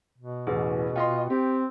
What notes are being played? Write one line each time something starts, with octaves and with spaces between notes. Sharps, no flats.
B2
A1 E2 G#4 B4
F4 D#5 G5 C6
C4 G4